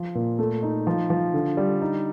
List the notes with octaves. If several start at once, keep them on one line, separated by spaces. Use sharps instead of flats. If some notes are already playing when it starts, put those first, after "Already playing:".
Already playing: F3
A#2
A3
D#4
F3
F3
D3
G3
D#4